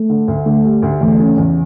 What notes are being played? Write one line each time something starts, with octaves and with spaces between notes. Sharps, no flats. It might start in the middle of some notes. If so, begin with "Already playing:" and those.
Already playing: A3
D3
D2
D3 A3
G3
D2
E2 A3
C#3
E2